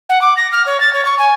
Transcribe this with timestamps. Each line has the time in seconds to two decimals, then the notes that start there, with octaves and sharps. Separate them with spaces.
0.09 F#5
0.21 D6
0.36 A#6
0.52 F6
0.66 C#5
0.80 A6
0.93 C#5
1.05 C#6
1.19 G#5